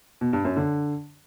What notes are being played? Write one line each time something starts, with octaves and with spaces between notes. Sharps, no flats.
B2
G2
F#2
D3